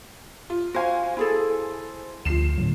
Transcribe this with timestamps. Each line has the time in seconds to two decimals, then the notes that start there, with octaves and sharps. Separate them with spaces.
0.50 F4
0.74 F#4 C5 F5 G#5
1.17 E4 G#4 A4
2.25 D2 F3 C7 E7
2.58 A2 D3 F#3